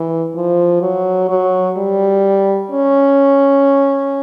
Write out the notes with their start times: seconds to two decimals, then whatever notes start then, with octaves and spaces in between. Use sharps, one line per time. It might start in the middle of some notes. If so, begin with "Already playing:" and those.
Already playing: E3
0.35 F3
0.82 F#3
1.29 F#3
1.77 G3
2.72 C#4